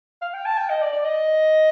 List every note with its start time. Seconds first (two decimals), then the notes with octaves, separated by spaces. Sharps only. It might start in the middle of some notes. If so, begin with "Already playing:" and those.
0.22 F5
0.34 G5
0.46 A5
0.57 G5
0.69 D#5
0.82 D5
0.93 D5
1.04 D#5